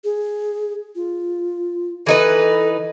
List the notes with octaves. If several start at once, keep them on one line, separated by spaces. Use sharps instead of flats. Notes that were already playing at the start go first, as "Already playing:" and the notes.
G#4
F4
E3 D#4 A4 B4